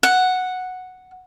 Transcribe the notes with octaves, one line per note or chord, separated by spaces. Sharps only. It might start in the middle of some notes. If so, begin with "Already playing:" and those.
F#5